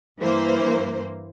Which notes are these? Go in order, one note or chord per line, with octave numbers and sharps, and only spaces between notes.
G2 E3 A#3 C5